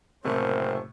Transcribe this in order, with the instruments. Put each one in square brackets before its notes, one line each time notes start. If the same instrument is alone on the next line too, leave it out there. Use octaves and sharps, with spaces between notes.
[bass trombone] F#1 [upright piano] A2 C3 A3 [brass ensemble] C4 C5 [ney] A#4